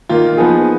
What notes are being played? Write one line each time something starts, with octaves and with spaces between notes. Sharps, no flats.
D#3 A#3 F4
F3 B3 D#4 G#4